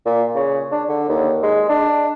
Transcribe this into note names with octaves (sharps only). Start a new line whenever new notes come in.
A#2
C#3
D4
D3
D#2
G#3
D4